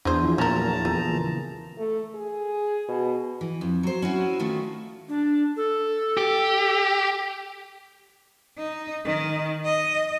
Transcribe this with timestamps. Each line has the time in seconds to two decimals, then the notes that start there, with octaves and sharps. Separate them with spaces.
0.05 E2 F#3 D4 G#4 C5
0.23 E2 F3 E4 F4
0.38 A#2 F#3 A#3 C#4 A#4 A5 A#5
0.85 E3 A3 F4 G#4
1.09 C#3 E3 A#3
1.78 A3
2.15 G#4
2.89 B2
3.41 E3
3.61 F2
3.83 F#3 C5
4.02 C#4 E4 F#4
4.39 D#3 A3 F4 F#4
5.09 D4
5.57 A4
6.17 G4
8.58 D#4
9.05 D#3
9.65 D#5